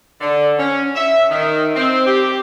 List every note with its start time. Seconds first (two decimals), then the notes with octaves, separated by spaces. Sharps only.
0.21 D3
0.59 C#4
0.95 E5
1.30 D#3
1.76 C4
2.07 G4